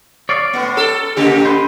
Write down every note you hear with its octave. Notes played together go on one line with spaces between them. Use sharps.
C#5 D5 F5
A2 B3
A4
C#3 A#3 G4
B4 C5